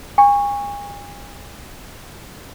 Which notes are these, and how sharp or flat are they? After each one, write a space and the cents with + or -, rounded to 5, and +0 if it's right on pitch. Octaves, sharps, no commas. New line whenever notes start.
G#5 -35 C#6 +0